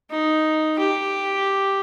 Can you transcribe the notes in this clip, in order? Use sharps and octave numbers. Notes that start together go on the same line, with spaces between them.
D#4
G4